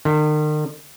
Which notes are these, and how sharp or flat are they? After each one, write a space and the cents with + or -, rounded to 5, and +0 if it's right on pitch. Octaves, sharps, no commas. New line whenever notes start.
D#3 -40